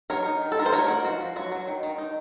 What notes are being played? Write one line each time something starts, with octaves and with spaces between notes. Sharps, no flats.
F#3 A#4 C#5
D#4
D#3
A4
D#3 A#4
C5
A3 A#4 C#5
D#4 F#4 A#4
F3 F#4
F3
F#3 F#4
F#3
D#3
D#3
D#4